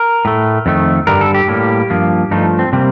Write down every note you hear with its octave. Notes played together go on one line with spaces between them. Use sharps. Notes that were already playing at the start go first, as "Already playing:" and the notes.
Already playing: A#4
A2 A3
F2 D#3 A3
G2 D3 G3 A#4
A4
G4
A2 G3 A#3
G2 F3 A#3
G2 F3 A3 D#4
C4
C3 G3 A#3 C4